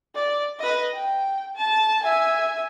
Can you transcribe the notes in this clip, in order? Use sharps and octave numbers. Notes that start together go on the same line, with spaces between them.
D5
B4 D#5
G5
A5
E5 G#5